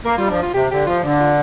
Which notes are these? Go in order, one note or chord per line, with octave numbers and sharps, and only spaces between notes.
A#3 A#4
G3 F4
F3 D4
F4
C3 G4
D3 G4
F3 F4
D3 D4
F4